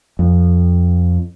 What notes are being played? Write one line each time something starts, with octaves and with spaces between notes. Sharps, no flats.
F2